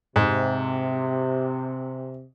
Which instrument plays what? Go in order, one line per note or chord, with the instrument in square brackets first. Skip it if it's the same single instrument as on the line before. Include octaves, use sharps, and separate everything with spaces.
[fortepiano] G#2 [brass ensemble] C3